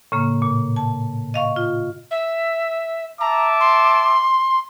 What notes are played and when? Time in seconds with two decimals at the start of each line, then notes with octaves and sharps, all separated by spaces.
0.12 A2 C#3 A#3
0.42 A#2
0.76 A5
1.34 D#5 F5 C#6
1.56 F4
2.11 E5
3.20 E5 A5 A#5 D6
3.60 C6